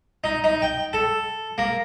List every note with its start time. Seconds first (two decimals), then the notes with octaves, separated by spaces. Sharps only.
0.24 D#4
0.44 D#4
0.62 G5
0.93 A4
1.58 A#3